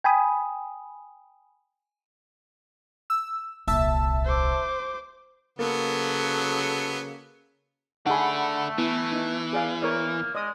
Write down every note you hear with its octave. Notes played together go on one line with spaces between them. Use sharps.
G5 G#5 B5 D#6
E6
D#1 C2 E5 A5 E6
C5 D6
C#3 F#3 A#3 B3 A4
A3 D4 D#4 G#4 A4 F#5 B5
E3 B3 E4
D#4
G#4 D5 F5
A#3 A#4 C#5 D5
G#3 D5 D#5 D#6